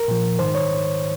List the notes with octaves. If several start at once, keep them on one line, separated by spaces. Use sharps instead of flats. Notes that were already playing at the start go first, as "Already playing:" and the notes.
Already playing: A#4
A#2 F3
G#2 D#3 C5
C#5